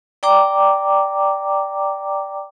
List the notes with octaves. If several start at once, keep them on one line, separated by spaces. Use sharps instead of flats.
D5 G5 A#5 D6